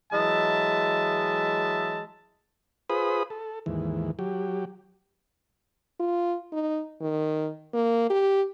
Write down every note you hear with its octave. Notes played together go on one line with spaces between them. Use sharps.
E3 F#3 G#3 D#5 E5 A5
F4 G#4 B4 C5 B5 D#6
A4
D#2 G#2 E3
F#3 G4
F4
D#4
D#3
A#3
G4